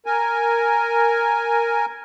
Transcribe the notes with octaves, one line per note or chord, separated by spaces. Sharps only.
A#4 G#5